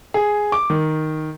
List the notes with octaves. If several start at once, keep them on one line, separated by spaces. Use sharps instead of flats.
G#4
D6
D#3